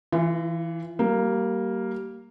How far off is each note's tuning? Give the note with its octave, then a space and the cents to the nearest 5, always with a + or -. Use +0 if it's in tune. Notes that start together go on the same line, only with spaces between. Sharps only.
E3 +0 F4 -35
G3 -25 A#3 -5